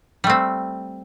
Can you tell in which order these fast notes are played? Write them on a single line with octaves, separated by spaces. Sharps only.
G3 A3 C4